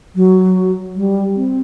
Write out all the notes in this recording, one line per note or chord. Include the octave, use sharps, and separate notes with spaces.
F#3
G3
C4